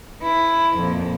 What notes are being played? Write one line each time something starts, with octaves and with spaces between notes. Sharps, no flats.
E4 B4
F2 A#2